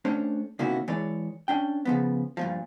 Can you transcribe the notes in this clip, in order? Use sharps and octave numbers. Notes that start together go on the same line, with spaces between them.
A3 C#4 D4 C5 C#5
C3 D#3 A#3 C#4 E4 F#4
E3 G#3 C#5 D5
C#4 D4 G5
C#3 F3 B3
G2 A#2 F3